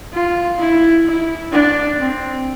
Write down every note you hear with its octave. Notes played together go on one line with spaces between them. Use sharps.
F4
E4
E4
D4
C4